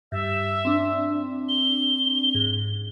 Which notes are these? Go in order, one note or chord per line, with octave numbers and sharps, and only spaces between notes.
G2 E5
C4 D4
G7
G#2